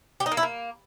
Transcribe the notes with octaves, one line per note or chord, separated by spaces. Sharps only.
G4
D#4
A#3
E4
A#3